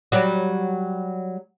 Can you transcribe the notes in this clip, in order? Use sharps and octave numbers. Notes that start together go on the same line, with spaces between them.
F#3 G3